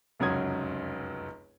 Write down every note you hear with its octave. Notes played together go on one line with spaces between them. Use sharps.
F1 C#2 F#2 F#3 D#6 G#6